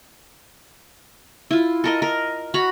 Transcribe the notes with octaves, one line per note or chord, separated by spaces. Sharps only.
E4 F4
A4 A#4 D#5
A#4
F#4 A#5 B5